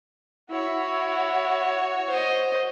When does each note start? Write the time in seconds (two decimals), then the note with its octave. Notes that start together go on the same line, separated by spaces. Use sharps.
0.50 E4 F#4 C#5
2.09 C5 D#5